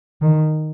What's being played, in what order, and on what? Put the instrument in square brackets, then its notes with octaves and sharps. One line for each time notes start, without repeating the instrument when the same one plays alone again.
[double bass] D#3